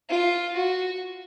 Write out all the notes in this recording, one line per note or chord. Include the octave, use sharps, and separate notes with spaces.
F4
F#4